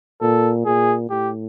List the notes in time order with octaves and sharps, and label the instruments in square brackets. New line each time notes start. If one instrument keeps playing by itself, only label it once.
[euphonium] A#2 [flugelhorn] A4
[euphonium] A#2 [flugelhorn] G#4
[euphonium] A2 [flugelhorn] G4